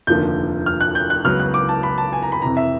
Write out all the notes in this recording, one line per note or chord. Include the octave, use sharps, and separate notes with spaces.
F1 D#2 D3 F3 A#3 G6
F6
F#6
G6
F#6
C#2 C#3 F#3 B3 F6
F#6
D6
A5
B5
A5
G#5
A#5
B5
F2 C3 E3 A#5
E5